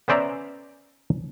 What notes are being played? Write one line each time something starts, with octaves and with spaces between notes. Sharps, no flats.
B3 C#4 C5 D5 E5 A#5